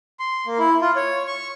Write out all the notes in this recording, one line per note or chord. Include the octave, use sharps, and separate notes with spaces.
C6
A#3
E4
F4
C#5
C#6